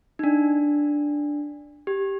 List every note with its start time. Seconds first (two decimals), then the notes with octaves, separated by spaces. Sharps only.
0.19 D#4
0.24 D4
1.87 G4